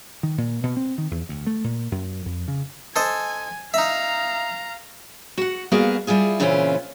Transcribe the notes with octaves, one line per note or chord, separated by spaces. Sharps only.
D#3
A#2
B2
C4
D#3
E2
D2
A3
A#2
F#2
F2
C#3
A4 C5 D#5 G#5
D#4 E5 F5 A#5
F#4 F#5
G3 A#3 B3 F#4 G#4 F5
G3 E4 F4 G#4
A#2 C#3 E3 C4 C#4 F4